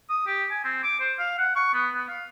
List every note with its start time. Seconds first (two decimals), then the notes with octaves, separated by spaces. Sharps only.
0.10 D#6
0.27 G4
0.51 G#5
0.65 C4
0.84 D6
1.00 C5
1.19 F5
1.38 F#5
1.56 C#6
1.74 B3
1.95 B3
2.09 F5